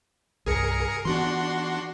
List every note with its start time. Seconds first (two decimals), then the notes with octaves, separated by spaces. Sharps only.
0.46 C2 G2 G#4 A#4 C#7
1.05 E3 B3 D4 F#4 C6